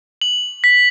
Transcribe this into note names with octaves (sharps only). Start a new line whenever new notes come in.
F#7
B6